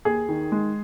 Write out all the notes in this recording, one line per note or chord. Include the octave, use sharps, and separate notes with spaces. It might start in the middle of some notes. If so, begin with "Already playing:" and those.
D#2 G#4
D#3
G#3